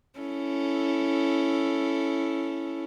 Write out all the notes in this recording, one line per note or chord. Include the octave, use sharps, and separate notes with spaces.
C#4 E4 A4